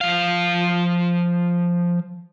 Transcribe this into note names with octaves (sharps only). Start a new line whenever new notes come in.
F3 F5